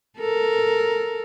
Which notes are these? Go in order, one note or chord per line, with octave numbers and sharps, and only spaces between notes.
A4 A#4